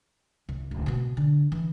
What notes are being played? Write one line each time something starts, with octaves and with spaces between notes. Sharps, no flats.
C2
D1
B2 B3
D3
E3